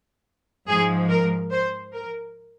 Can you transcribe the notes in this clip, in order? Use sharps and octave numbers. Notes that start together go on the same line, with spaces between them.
G#2 F3 G#3 G#4
A#4
C5
A#4